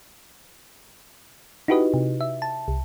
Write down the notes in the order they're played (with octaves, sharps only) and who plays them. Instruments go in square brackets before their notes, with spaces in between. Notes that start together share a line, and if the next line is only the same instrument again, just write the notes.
[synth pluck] D#4 E4 F#4 G4 B4 D#5
C3
E5
A5
C2